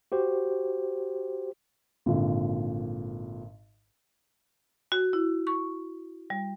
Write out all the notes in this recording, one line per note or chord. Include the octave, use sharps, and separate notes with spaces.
F#4 G4 C5
G#1 A#2 D3
F#4
E4
C#6
G3